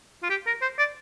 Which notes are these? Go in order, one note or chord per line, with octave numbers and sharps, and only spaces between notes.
F4
G4
A#4
C5
D5